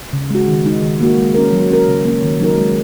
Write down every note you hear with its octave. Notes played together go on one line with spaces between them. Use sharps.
C#3
G#3 F#4
D#3
G#3 D#4
D#3
A#3 F#4
G#3
C#4 A#4
F#3
C#4 A#4
C#3
A#3 C#4
D#3
F#3 D#4 A#4
G#3